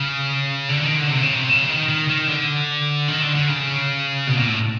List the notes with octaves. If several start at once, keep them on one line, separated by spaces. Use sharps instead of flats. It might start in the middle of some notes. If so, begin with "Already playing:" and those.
Already playing: C#3
D3
D#3
D3
C3
C#3
C3
C#3
D#3
D#3
D#3
D3
D#3
D3
D3
C#3
B2
A#2
A2